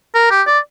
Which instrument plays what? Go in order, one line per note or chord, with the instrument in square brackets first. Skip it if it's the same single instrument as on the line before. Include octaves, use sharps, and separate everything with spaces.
[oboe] A#4
G4
D5